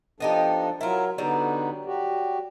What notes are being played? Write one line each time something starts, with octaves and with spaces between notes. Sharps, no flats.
F3 B3 D4 D#4 G4 A4
F#3 E4 F4 A#4
D3 F#3 G3 B3 D#4 D5
F#4 G4